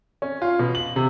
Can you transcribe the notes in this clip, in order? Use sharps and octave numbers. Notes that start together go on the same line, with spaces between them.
C#4
F4
B2
F#7
C3